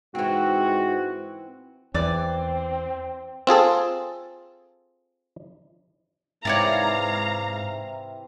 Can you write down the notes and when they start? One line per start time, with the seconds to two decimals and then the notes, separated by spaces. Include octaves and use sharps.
0.15 G#2 E3 C4 F#4
1.94 E2 E3 C4 D5
3.47 C4 F4 G#4 A4
6.45 G#2 C3 E3 C#5 D5 F5 A5 A#5